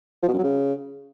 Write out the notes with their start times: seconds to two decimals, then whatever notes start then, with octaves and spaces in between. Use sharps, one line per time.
0.23 F3
0.28 B2
0.33 F#2
0.38 F#3
0.44 C#3